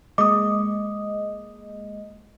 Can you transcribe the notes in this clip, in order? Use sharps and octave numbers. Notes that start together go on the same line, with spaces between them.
G#3 A#3 D#5 D6 D#6